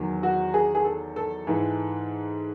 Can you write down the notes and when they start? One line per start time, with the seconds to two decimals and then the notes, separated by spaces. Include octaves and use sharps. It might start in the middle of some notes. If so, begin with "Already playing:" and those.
Already playing: E2 D#3 F#3
0.23 F#4
0.54 G#4
0.75 G#4
0.84 A4
1.16 A4
1.47 G#2 E3